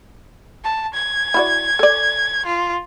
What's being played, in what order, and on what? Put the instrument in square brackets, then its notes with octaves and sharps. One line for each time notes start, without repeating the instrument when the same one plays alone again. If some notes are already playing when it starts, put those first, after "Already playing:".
[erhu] A5
G#6
[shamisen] E4 F#4 D5
A4 D5
[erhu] F4